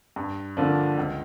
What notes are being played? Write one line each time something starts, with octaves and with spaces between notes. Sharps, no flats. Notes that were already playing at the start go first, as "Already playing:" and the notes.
G2
D3 F3 A#3 D4
C#2